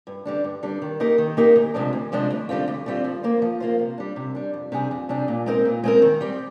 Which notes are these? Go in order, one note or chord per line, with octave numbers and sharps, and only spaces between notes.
G2
D3 G3 D4
G2
D3 G3 D4
D#3
A#3 D#4 G4 A#4
D#3
A#3 D#4 G4 A#4
D2
C3 F3 G#3 D4
D2
C3 F3 G#3 D4
D2
D3 G3 C4 F4
D2
D3 G3 C4 F4
F3
A#3 F4 C5
F3
A#3 F4 C5
C3
G3 D4
C3
G3 D4
F2
C3 G3 D4 G#4
F2
C3 G3 D4 G#4
A#2
G#3 C4 D#4 A#4
A#2
G#3 C4 D#4 A#4
D#3
G3 C4